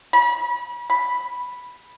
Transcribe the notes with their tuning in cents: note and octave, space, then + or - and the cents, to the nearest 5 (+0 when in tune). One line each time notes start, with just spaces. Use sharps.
B5 -40
B5 -5